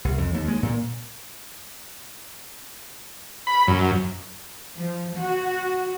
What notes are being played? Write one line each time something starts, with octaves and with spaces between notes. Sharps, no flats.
C2
F2
D#2
G#3
A#2
B5
F#2
F3
F#4